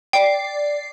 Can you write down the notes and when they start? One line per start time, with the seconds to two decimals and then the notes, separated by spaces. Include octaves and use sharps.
0.13 D5 G5 C7